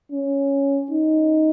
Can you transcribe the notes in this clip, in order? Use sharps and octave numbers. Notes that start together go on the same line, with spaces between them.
C#4
D#4